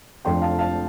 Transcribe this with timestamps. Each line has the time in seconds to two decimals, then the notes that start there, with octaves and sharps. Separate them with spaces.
0.25 F1 F2 F3 D4 G5 C6
0.42 F5 A5
0.59 F5 A5